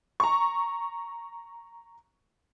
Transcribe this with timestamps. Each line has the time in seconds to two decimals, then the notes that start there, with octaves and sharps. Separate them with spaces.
0.20 A#5 C#6